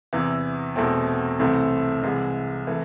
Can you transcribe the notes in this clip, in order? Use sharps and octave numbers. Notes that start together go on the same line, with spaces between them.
E2 C3 E3
E2 B2 A3 C4
C2 C3 E3 A3 C4
C2 C3 E3 G#3
C3 E3 A3